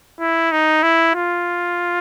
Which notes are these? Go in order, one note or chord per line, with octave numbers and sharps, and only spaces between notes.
E4
D#4
E4
F4